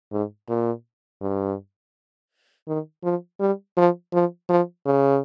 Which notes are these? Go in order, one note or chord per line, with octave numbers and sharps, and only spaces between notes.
G#2
A#2
G2
D#3
F3
G3
F3
F3
F3
C#3